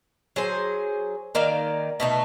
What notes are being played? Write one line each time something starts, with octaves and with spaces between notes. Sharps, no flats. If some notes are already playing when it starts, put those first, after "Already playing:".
F#3 G#4 C5
D#3 A#3 D5 F5
B2 A3 D#4